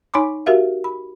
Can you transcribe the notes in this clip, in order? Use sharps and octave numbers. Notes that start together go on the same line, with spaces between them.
D#4 C#5 G#5 B5 C6 D6
F#4 G4 A#4 E5 F5
B5